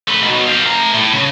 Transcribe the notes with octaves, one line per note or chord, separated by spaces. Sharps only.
A3 B4
B2 F#3
G4 F5
A3 A#5
A2
C#3